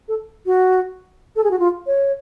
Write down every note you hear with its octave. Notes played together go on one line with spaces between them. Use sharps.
A4
F#4
A4
G#4
F#4
F4
C#5